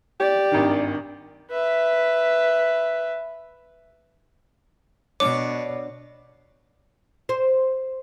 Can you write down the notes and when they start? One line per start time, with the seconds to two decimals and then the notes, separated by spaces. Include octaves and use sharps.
0.20 G4 D5
0.51 G#1 G2 D#3
1.51 B4 E5
5.20 B2 D4 C#5 D6
7.29 C5